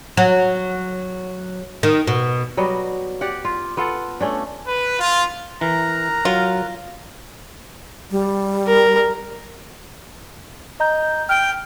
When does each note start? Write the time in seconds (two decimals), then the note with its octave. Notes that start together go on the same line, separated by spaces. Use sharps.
0.17 F#3
1.83 D#3
2.07 B2
2.57 F#3 G3 B3 D#5
3.21 G4 D5 F#5
3.45 F4
3.77 B3 F4 A4 F#5
4.21 A3 C#4 D4
4.66 B4
4.98 F4
5.61 E3 A#4 A#5 F#6
6.25 F#3 F4
8.11 G3
8.67 A#4
10.80 D#5 A#5 G6
11.29 G5 F6